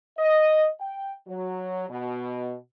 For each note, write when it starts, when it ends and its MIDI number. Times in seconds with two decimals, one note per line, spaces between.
0.19 0.68 75
0.81 1.12 79
1.28 1.85 54
1.90 2.54 47